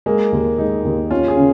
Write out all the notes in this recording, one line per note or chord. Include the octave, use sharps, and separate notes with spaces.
G#3 A#3
D#2
G#3 D#4
D#2
C#4 F4
G#4
C#3